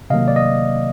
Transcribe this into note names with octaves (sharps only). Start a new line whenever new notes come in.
C3 D#3 F#3 A#3 D#5 F5
D5
D#5